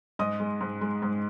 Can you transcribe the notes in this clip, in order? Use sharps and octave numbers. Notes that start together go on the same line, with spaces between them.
G#2 D#5 D#6
G#3
G#2
G#3
G#2